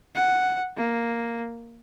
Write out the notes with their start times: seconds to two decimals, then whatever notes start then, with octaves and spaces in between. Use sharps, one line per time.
0.15 F#5
0.76 A#3